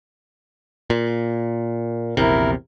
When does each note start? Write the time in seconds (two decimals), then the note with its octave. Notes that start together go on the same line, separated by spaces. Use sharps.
0.90 A#2
2.17 A#1 E2 C3 E4 A#4